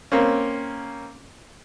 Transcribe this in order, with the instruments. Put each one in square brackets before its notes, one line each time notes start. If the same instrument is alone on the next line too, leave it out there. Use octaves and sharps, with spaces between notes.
[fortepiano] A#3 C4 C#4